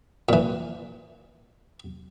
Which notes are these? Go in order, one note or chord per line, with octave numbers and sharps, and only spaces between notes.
A#2 E3